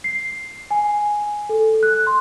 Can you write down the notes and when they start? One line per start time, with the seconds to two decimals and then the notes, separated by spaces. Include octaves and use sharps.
0.04 C7
0.71 G#5
1.49 A4
1.83 F#6
2.07 C6